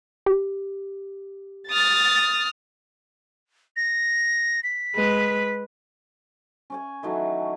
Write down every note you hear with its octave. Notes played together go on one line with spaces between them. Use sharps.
G4
D#6 F6 A6
A#6
B6
G#3 B4
C#4 C#5 G#5
D#3 E3 F#3 A3